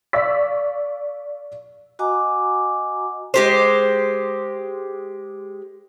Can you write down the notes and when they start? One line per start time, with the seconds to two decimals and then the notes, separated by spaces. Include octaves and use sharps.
0.13 D5 F5 C#6 E6 B6
1.99 F#4 D#5 F#5 G#5 A#5 D6
3.34 G#3 G4 C5